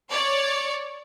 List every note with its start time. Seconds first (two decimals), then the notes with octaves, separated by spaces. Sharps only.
0.11 C#5 D5